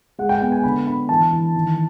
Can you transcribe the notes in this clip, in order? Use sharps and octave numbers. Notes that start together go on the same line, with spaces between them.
G#3 F#5
G5
B3 G5
G#5
D3 B5
D4 B5
E3 A5
E3
D#3